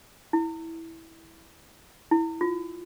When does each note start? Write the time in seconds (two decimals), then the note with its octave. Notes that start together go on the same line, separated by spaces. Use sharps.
0.33 E4
2.11 E4
2.41 F4